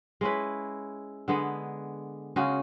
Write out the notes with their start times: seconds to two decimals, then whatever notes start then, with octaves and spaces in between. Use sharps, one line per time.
0.21 G#3 C#4 E4 B4
1.28 D3 G#3 B3
2.36 C#3 G#3 C#4 F#4